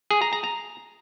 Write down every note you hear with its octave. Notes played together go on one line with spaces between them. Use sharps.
G#4
A#5
A#5
A#5